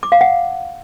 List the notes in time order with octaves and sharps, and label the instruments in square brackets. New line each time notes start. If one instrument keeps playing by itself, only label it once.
[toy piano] D6
F5
F#5